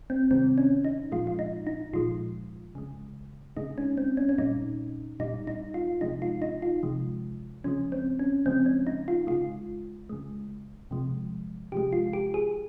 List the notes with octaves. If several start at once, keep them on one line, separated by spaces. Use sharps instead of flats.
C4
C3 D#3 G3 C4
C#4
D#4
A#2 F3 G#3 F4
F4
D#4
D#4
A#2 F3 G#3 F4
C#3 G#3
C#3 G#3 D#4
C#4
C4
C#4
C#4
A#2 G3 D#4
A#2 G3 D#4
D#4
F4
C3 F3 G#3 D#4
F4
D#4
F4
C3 F3 G#3
C#3 F3 G#3 C#4
C4
C#4
C#3 F3 G#3 C4
C#4
D#4
F4
C#3 G#3 F4
C#3 G#3
C3 F3 G#3
C3 F3 G#3 G4
F4
G4
G#4